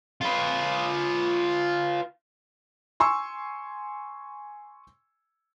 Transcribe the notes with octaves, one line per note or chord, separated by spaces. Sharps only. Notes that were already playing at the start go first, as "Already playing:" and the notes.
F4 B4
G#5 C6 C#6 E6